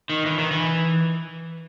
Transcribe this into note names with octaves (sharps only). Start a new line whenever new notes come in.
D#3
E3
D#3
E3